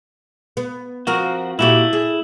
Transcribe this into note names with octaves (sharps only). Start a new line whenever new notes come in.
B3
F3 C4 F#4 A#4
A#2 A3 E4 F#4 G4
G#4